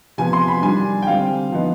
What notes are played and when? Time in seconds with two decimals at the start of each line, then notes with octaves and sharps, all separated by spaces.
0.18 C3 F3 B3 G#5
0.33 C6
0.48 B5
0.62 D#3 G3 D4 G#5
1.02 G5
1.07 D3 G3 C4 F5
1.52 F3 B3 D#4